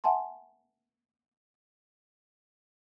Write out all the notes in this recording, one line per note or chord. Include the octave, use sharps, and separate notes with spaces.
E5 F#5 G#5 A5 C6